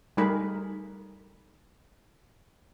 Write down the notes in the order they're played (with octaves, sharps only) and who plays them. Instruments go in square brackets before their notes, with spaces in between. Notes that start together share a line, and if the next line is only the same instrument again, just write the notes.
[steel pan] G3 A3 D#4 G#4 A#4 B5